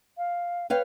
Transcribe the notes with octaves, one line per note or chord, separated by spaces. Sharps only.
F5
B4 C#5 F5 G5